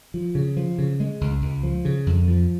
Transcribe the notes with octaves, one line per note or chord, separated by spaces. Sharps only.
F3
C#3
F3
C#3
G#3
C#2
C#2
F3
C#3
F2
F3